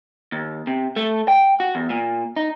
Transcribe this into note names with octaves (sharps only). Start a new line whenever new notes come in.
D#2
C3
A3
G5
F#4
E2
A#2
D#4